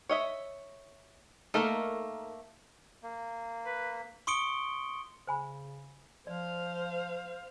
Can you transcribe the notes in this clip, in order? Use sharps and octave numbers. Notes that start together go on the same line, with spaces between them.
C#5 D#5 E5
A3 A#3 D#4 A4 A#4
A#3
B4
C6 C#6 D#6 C#7 D7 G7
C#3 C5 G#5 B5
F3 C5 D5 F5